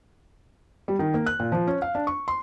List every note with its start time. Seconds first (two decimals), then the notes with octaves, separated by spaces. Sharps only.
0.88 G3
0.99 D#3
1.14 A#3
1.26 F#6
1.40 A#2
1.52 F3
1.67 C#4
1.82 F5
1.95 D4
2.07 C#6
2.28 C6